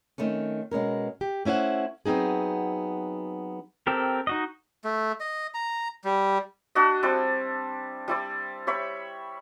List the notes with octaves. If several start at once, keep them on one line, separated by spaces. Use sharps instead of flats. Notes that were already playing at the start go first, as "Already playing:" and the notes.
D#3 A3 C4 C#4
B2 G#3 C#4 A#4
G4
A3 C#4 E4 C5 F#5
F#3 B3 C4 D#4 G#4
C4 G4 A4 A#4
D#4 F#4 D#5
A3
D#5
A#5
G3
D4 F#4 D#5
G3 C4 E4 D5
G3 E4 D5
G4 C#5 E5 B5